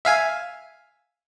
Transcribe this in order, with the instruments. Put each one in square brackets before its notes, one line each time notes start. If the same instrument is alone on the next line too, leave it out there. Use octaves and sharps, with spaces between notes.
[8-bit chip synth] E5 F5 G#5